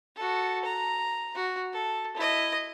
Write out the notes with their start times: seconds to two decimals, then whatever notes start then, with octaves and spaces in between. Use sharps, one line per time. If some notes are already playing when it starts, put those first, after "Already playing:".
0.16 F#4 A4
0.65 A#5
1.35 F#4
1.73 A4
2.16 E4 D#5